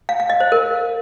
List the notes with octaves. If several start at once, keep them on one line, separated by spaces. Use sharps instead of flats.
F5
F5
D#5
C5
A#4